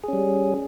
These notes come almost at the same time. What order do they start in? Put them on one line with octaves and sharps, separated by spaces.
G#4 C#4 G3